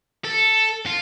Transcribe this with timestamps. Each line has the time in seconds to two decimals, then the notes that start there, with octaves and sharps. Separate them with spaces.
0.24 A4
0.86 F4